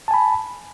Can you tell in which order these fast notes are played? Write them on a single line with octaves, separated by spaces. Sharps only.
A5 G#5 B5